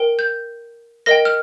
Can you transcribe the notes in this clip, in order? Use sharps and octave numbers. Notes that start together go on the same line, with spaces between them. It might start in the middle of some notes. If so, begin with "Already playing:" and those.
Already playing: A#4 G5
G6
A#4 D#5 G5 A#6
F6